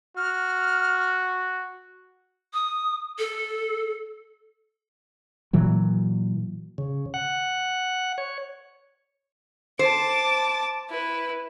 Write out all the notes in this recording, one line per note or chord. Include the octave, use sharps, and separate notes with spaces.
F#4 F6
D#6
A4
A#2 E3 F#3
C#3
F#5
C#5
C5 A5 D6
E4 B4